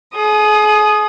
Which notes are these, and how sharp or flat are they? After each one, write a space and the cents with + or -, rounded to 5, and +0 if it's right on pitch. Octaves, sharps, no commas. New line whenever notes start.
G#4 +40 D#6 +0